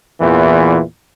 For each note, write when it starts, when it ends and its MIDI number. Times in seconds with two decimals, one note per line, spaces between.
0.21 0.81 40
0.21 0.81 46
0.21 0.81 52